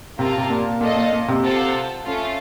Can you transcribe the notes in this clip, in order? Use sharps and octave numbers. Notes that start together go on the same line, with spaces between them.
C3 A#3 F4 A#4 F5 A5
C3
A#2
A#2 F4 A4 D#5
A#2
A#2
C3
F4 A4 C5 F#5 A5
A3 C#4 F4